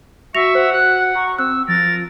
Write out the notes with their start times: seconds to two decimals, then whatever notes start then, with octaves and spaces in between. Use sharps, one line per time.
0.34 F#4 E5 C#6 A#6 F7
0.55 C5 F#5
0.73 F#4 F#6
1.15 A#5 C#6
1.39 C4 E6 F#6
1.68 F3 A#4 A6